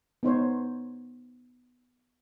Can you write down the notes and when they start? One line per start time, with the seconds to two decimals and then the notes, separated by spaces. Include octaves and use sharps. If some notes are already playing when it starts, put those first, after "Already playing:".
0.23 B3 D#4 C5 C#5